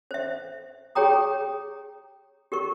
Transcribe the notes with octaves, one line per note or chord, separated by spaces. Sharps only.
C5 E5
G4 G#4 C#5 G5 A#5 D#6
G4 A#4 C#6